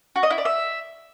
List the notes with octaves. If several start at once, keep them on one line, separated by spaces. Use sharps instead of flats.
F#4
D#5
E4
D5
E5